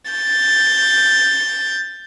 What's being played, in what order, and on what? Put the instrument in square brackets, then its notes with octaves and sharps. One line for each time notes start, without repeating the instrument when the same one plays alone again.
[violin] G6 A6